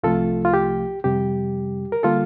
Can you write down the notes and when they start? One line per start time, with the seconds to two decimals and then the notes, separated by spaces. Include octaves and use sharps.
0.03 C2 C3 F3 A3 F4 A4
0.45 F4
0.54 G4
1.04 F2 C3 G3 G4
1.92 A#4
2.03 D3 G3 A#3 F4 A4